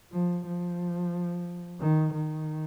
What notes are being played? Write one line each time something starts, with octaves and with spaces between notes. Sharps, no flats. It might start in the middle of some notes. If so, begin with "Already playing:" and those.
F3
F3
D#3
D#3